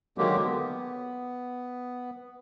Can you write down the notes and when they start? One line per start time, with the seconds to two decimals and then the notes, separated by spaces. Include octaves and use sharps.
0.18 D3 D#3 F#3 G#3 A#3 G4
0.43 B3